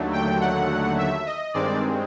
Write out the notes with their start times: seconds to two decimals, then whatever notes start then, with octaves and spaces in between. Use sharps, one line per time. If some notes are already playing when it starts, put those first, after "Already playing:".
Already playing: D#2 D3 F#3 A3
0.13 G5
0.41 F#5
0.98 E5
1.26 D#5
1.54 G2 D#3 G#3 C4 D5